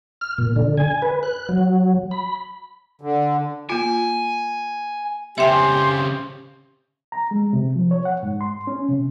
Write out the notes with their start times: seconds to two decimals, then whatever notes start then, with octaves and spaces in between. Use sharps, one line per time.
0.21 F6
0.38 A#2
0.56 D3
0.77 G#5
1.02 B4
1.23 F#6
1.49 F#3
2.11 B5
3.01 D3
3.69 A#3 F4 G#5
5.38 C#3 C4 G4 E5 G5 G#5 C6
7.12 A#5
7.31 G#3
7.53 C3
7.76 F3
7.91 C#5
8.05 F#5
8.23 G#2
8.41 C6
8.67 C#4
8.88 C3